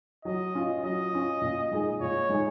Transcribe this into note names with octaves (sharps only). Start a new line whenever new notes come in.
F#3 D#5
C#4 F4
F#3 D#5
C#4 F4
A#2
G#3 D#4 G#4
A#2 C#5
G#3 D#4 G#4